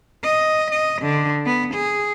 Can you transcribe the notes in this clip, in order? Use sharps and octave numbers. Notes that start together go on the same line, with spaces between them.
D#5
D#5
D3
B3
G#4